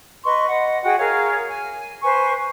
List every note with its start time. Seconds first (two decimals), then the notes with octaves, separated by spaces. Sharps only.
0.24 B4 D#5 C6 C#6
0.49 D#5 F#5
0.83 F#4 G#4 F#5 G5
0.98 G#4 A#4 C#5 F5
1.48 G#5
2.02 B4 C5 G#5 C#6